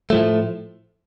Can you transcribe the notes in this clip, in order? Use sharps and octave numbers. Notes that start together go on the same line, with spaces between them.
A2 F3 A3